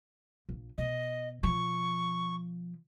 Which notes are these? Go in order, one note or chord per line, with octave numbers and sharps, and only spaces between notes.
A#1
B2 D#5
B2 F3 C#6